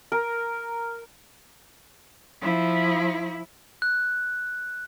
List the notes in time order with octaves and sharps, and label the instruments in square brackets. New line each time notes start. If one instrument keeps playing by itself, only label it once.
[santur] A#4
[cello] F3 E4
[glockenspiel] F#6